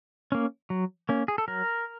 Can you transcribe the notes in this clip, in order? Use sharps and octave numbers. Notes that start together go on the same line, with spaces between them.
A#3 C#4
F#3
A#3 C#4
G#4
A4
F#3 A#4